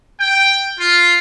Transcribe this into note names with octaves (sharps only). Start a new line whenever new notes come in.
G5
F4